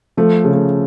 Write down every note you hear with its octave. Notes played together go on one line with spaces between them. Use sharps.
F3 A3
C#3
A3